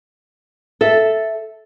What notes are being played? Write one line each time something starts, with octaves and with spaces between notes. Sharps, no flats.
A4 E5